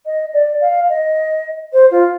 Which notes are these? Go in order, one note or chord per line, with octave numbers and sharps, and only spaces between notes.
D#5
D5
F5
D#5
C5
F4